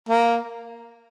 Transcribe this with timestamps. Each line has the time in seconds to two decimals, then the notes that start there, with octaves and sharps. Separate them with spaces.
0.09 A#3